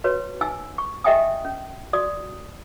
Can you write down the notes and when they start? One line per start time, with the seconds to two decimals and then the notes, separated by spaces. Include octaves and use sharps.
0.04 F#4 B4 C#5
0.41 D#4 G#5 E6
0.78 C#6
1.04 G4 D#5 E5 G5 G#5 D#6
1.45 C#4
1.93 F#4 D5 D#6